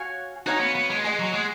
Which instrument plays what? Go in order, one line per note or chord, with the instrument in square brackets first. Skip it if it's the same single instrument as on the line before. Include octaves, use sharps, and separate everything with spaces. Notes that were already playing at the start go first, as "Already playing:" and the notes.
Already playing: [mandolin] F#4 C#5 F5 G#5
[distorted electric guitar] D#4 [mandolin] F#4 C#5 F5 G#5
[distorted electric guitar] B3
B3
G#3
[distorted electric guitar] G#3 [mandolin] G#4 D#5 F#5
[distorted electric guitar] F#3
G#3